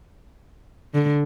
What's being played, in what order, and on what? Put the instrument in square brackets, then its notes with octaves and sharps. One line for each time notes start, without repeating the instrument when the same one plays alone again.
[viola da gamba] D3